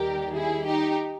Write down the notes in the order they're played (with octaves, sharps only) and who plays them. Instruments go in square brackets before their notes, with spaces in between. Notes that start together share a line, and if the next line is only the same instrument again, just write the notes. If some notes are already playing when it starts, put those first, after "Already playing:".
Already playing: [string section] D#2 D#3 G3 G4 A#4
E4 G#4
D#4 G4